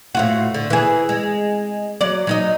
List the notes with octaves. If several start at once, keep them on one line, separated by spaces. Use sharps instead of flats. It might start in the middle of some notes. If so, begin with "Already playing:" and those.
A2 F4 F#4
D3
E3 G#4
G#3
F#3 D5
F#3 D#4 D#5